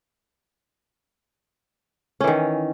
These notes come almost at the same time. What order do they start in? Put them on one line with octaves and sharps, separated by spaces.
C#4 E3 D#3